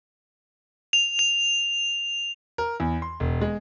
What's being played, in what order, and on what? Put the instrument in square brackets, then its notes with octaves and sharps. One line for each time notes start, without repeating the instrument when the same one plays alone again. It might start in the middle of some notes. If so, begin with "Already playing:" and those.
[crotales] F7
F7
[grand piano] A#4
E2
C6
E1
G#3